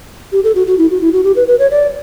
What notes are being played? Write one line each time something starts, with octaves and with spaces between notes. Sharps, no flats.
G4
A4
F#4
F#4
E4
F#4
E4
F#4
G4
B4
B4
C#5
D5